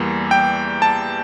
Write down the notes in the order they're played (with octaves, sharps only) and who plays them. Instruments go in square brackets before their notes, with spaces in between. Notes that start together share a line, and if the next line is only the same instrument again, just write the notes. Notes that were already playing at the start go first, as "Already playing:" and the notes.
Already playing: [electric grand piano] E2 E3 G3 A#3
G5
A5